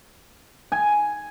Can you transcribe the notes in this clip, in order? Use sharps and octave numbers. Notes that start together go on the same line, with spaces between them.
G#5